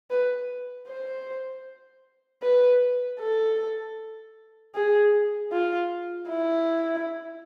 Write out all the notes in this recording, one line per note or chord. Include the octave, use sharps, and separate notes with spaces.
B4
C5
B4
A4
G#4
F4
E4